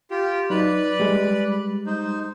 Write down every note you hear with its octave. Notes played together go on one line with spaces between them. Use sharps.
F4 G4
F#3 D#4 B4 D5 B5
G3 G#3
D#4 C5